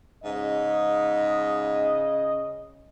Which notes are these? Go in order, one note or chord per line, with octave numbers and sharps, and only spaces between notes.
G#2 C#3 D#5